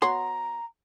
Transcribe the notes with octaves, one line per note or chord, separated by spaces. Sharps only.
B3 F#4 C#5 A#5 C6